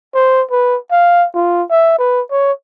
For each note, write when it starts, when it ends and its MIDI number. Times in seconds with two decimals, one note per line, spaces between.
0.14 0.42 72
0.51 0.77 71
0.91 1.26 77
1.34 1.63 65
1.70 1.93 76
1.98 2.21 71
2.31 2.52 73